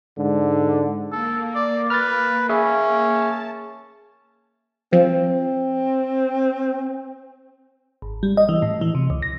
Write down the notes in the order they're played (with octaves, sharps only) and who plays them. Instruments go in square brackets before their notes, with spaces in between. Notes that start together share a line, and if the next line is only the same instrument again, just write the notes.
[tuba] G#2 [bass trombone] D3
[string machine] A#3 [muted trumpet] A4
[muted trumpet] D5
[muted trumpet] B4 [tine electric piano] F6 A6
[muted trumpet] C#4 [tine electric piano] G#4 E5
[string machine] A5
[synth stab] F3 [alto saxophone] C4
[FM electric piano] G#1
G3
D#5
E3
A2
E3
C3
C#2
A#6